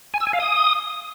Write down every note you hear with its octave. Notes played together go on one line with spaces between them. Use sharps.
G#5
E6
G#5
F5
D#6